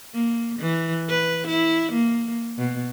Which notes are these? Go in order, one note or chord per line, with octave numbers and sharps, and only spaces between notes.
A#3
E3
B4
E4
A#3
B2